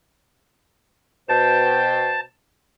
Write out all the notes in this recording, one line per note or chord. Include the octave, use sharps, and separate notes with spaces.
B2 C5 G5 A5